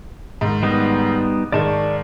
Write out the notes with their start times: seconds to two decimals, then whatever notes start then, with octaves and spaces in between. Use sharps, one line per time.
0.41 G#2 D#3
0.63 G3 B3 D#4
1.52 G#2 D#3 G#3 D5 A5 C#6